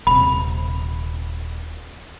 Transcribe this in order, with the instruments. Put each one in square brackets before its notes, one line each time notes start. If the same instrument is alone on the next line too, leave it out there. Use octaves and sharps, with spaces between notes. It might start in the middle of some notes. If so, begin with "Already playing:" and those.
[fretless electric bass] D#1 C3 [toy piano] B5